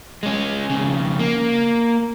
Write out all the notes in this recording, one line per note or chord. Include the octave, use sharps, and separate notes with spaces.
G#3 C#4
F2 C#3
A#3